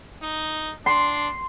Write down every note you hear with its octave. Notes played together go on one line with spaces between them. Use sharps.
D#4
D4 C6